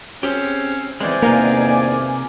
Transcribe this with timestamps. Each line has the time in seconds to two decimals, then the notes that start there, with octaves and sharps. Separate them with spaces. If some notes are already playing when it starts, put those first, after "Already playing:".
0.23 C4 C#4 G4 G#4 C5
1.01 C#3 E3 G#3 B3 C4 C5 D5 G#5
1.22 E2 G2 C3 D#3 A#3 F4 A#4